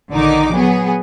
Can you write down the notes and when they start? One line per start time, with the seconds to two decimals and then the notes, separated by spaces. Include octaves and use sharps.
0.12 A#1 D3 D#3 D#4 D6
0.55 F#3 B3 G#4